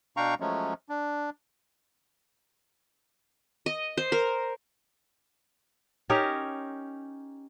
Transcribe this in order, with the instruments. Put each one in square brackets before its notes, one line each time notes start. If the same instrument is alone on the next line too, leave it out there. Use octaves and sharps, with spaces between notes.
[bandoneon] B2 D4 F5 G5 A#5 C#6
F3 F#3 G#3 A3 C#4
D4
[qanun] D#5
C5
A#4
[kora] C#4 D#4 G4 A#4